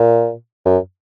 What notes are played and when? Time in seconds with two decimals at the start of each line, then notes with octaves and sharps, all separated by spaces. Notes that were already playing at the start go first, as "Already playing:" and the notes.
Already playing: A#2
0.65 F#2